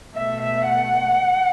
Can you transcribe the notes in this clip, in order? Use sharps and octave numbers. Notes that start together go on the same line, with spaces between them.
B2 A3 E5
E5
F#5